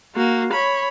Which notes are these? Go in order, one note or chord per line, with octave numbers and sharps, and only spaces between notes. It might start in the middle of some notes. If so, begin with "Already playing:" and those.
A#3 F#4
C#5 B5